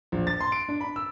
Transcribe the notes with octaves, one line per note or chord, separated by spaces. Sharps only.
A#1
A6
C6
D7
D4
B5
E6